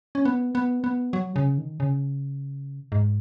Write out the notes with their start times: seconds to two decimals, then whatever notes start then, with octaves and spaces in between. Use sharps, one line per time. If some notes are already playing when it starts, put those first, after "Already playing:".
0.15 C#4
0.25 B3
0.55 B3
0.84 B3
1.13 F#3
1.36 C#3
1.58 D#3
1.80 C#3
2.92 G#2